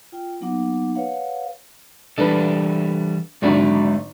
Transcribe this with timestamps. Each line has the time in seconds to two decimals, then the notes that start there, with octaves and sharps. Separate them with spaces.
0.12 F4 G5
0.40 F#3 A#3 B3 D#4 F#5 D6
0.95 B4 C#5 F5 F#5
2.18 E3 G3 D4 A4 B4
3.42 G#1 D3 F#3 G#3 D5 E5